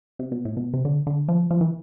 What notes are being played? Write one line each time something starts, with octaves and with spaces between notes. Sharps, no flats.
C3
B2
A2
B2
C3
D3
D3
F3
F3
E3